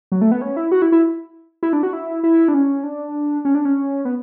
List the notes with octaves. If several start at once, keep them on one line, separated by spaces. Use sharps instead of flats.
F#3
A3
B3
C#4
E4
F#4
E4
E4
E4
D4
F#4
E4
E4
D4
C#4
D4
C#4
D4
C#4
B3